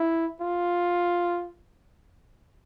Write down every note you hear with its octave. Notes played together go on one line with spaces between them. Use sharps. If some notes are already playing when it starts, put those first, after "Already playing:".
Already playing: E4
F4